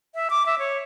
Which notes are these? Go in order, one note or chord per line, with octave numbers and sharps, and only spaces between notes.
E5
D6
E5
C#5